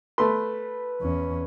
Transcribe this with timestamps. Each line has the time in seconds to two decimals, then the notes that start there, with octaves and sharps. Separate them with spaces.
0.18 A3 B4 C6
1.02 E2 C#4